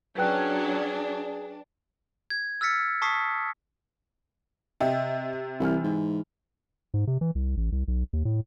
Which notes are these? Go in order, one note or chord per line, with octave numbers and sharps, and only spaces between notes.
F#3 C#4 D4 G#4 B4 G5 F#6
G#6
E6 F6 A6 B6 C#7
A5 C#6 D#6 B6 C7
C3 D#5 E5 G5
C2 E3 F6
G#2
G#2
C3
E3
C2
A1
C2
B1
D#2
A2